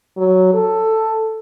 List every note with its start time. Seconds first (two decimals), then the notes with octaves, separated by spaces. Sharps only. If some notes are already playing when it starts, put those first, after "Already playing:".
0.18 F#3
0.54 A4